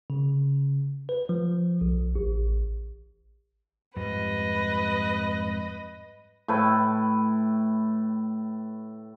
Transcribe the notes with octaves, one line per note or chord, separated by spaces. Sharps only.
C#3
B4
F3
B1
A1
F2 G#2 G3 B4 D#5
A2 A4 B4 G5